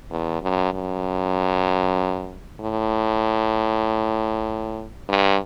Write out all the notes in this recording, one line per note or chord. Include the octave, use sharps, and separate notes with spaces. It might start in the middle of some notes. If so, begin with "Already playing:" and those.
E2
F#2
F#2
A2
G2